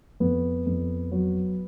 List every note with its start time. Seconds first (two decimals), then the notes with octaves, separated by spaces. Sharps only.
0.20 F2 B3
0.66 F2
1.12 F#3